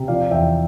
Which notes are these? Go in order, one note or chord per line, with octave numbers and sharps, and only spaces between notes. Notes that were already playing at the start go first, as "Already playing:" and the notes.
Already playing: C3
F3 D5 F5
E2 E5 G5